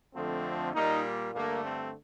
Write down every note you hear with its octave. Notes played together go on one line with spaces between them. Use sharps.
F2 D3 F3 A3 C4
A#2 G3 A#3 D#4
G2 D3 A3 A#3
C4